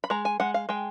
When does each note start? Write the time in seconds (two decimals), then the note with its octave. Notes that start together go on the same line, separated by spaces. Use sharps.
0.04 B5
0.10 G#3 A#5
0.25 G#5
0.40 G#3 F#5
0.54 F5
0.69 G#3 G5